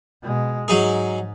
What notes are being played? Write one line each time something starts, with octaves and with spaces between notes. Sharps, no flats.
B2 G#3
G#2 F#3 D#4 G#4